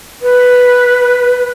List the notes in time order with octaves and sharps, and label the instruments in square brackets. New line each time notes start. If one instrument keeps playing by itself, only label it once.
[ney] B4